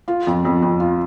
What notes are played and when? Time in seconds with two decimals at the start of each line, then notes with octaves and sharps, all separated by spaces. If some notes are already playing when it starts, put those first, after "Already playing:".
0.08 F4
0.27 F2
0.45 F2
0.62 F2
0.80 F4